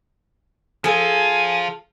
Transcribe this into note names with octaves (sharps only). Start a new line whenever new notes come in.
F3 F4 G#4 A4 G#5